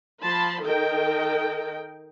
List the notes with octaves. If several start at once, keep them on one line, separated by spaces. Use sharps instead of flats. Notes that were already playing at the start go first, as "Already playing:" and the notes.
F3 A5 B5 C6
D#3 A4 A#4 D#5 G5